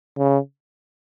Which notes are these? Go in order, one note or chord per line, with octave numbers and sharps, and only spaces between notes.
C#3